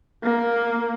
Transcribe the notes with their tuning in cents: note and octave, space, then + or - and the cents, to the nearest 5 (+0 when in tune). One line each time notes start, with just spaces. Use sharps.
A#3 +5